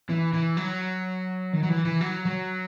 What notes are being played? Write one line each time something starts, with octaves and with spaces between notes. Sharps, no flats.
E3
E3
F#3
D#3
F#3
E3
E3
F#3
F#3